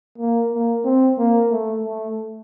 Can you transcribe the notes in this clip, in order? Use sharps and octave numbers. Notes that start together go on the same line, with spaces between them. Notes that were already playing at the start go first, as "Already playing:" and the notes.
A#3
A#3
C4
A#3
A3
A3